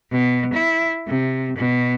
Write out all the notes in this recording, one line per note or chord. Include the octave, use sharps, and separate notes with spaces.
B2
E4
C3
B2